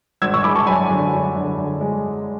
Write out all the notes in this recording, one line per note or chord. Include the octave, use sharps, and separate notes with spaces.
G#1 E6 G#6
C#6 E6
G#3 B5 D6
A5 C#6
F#2 G#5 B5
D3
F#2
D3
D3
G#3